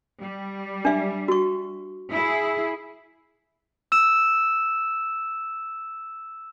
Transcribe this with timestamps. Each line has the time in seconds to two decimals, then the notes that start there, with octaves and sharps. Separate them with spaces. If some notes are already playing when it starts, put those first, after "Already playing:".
0.21 G3
0.85 D4 E5
1.28 F#4 C#6
2.12 E4 G#4
3.92 E6 E7